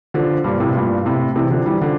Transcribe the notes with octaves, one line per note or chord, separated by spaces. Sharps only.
D3 F3
G2 A#2
A2 C3
G2 A#2
A2 C3
C3 E3
D3 F3
E3 G3
D3 F3